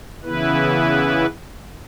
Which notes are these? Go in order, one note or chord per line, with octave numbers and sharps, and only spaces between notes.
C#3 E3 B3 E4 B4